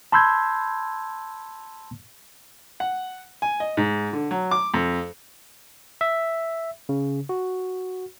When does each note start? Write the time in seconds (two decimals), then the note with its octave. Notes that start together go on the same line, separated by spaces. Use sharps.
0.12 A5 B5 C6 E6 G6 G#6
2.80 F#5
3.42 G#5
3.60 D#5
3.77 G#2
4.13 D3
4.31 F#3
4.51 D6
4.74 F2
6.01 E5
6.89 C#3
7.29 F#4